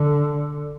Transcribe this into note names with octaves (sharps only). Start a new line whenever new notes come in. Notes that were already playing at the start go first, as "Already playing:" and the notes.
Already playing: D3